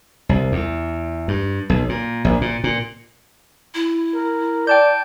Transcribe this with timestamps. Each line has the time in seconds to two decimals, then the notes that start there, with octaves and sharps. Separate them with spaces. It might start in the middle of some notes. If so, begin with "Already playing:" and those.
0.29 C2
0.52 E2
1.28 G2
1.70 B1
1.89 A#2
2.25 A#1
2.41 A#2
2.64 A#2
3.74 E4
4.15 A#4
4.67 D5 G5 A5 G6